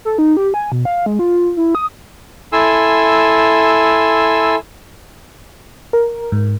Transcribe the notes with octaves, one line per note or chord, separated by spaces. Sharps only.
A4
D#4
G4
G#5
B2
F5
G#3
F4
E4
D#6
E4 A4 G#5 C6 E6
A#4
G#2